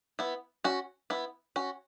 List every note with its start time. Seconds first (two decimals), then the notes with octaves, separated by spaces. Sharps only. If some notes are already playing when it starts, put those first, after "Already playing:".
0.19 B3 E4
0.64 C#4 F#4
1.10 B3 E4
1.56 C#4 F#4